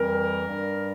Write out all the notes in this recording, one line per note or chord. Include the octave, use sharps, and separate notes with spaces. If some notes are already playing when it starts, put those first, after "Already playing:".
Already playing: F2 E3 G3 A#4
G2 G3